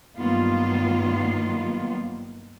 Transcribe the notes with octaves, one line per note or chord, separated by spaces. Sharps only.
G2 D#3 F#3 A#3 B3 F4